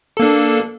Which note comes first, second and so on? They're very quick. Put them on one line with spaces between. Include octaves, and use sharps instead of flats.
A4 A#3 D4